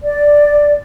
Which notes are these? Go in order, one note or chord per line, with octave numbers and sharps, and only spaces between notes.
D5